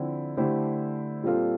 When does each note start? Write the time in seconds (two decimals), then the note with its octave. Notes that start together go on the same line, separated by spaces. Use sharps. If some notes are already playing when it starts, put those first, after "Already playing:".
Already playing: D3 F3 C4 E4
0.37 D3 A3 E4 G4 C5
1.24 A#2 G3 C4 F4 A4